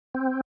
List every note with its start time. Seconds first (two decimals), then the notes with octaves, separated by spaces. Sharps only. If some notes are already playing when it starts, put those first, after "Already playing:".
0.14 C4